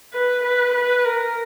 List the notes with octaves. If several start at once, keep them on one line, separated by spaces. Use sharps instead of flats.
B4
B4
B4
A#4